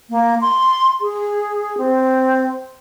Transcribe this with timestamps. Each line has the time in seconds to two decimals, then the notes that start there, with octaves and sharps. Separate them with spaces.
0.10 A#3
0.41 C6
1.01 G#4
1.78 C4